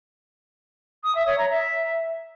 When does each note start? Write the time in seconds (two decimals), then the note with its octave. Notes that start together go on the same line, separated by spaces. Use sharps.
1.04 D#6
1.15 E5
1.27 C#5
1.38 A#5
1.50 E5